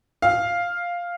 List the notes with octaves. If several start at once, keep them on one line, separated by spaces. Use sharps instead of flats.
F5